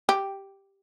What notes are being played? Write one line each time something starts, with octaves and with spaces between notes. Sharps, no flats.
G4